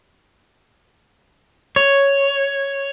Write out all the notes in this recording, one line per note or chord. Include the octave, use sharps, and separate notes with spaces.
C#5